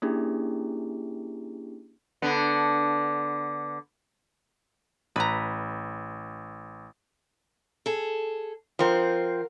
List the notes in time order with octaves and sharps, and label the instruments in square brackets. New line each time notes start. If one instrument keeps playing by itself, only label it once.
[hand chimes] A#3 C#4 D4 E4 G4 G#4
[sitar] D3 B3
[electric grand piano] A1 [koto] B4 A#5
[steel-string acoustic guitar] G#4 A4
[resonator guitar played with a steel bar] F3 C4 [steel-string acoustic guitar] A#4 F#5